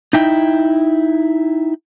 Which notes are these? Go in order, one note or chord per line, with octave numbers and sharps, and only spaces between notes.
D#4 E4 G5